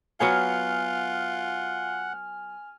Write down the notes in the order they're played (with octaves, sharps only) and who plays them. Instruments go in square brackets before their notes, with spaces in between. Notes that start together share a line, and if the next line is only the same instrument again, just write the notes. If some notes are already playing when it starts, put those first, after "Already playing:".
[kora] F#3 B3 C#5 [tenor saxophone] F4 [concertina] F#5 [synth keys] G#5 F6